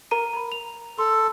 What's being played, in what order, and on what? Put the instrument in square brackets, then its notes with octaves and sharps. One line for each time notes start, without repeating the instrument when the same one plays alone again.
[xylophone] A#4 A#5 D#7
A#5 B5
F7
[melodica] A4 [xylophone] C6